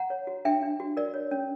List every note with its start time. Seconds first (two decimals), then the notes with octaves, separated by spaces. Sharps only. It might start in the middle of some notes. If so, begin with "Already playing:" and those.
Already playing: F#5 A#5
0.10 C#5
0.27 F#4
0.45 D4 E5 G5
0.63 D4
0.80 F#4
0.97 A#4 D5
1.14 C#5
1.31 C#4